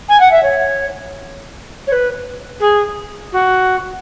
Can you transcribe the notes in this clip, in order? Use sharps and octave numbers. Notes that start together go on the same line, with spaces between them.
G#5
F#5
E5
C#5
C#5
B4
G#4
F#4